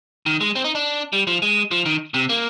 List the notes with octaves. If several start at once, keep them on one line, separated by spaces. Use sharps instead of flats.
D#3
G#3
C4
D#4
D4
G3
F3
G#3
F3
D#3
C3
A#3